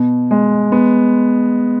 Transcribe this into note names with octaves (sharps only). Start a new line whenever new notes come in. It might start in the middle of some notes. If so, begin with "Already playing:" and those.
Already playing: B2
G#3
B3